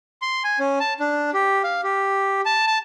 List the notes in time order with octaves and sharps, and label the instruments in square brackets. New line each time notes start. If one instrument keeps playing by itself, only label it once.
[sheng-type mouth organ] C6
G#5
C#4
A5
D4
G4
F5
G4
A5
A5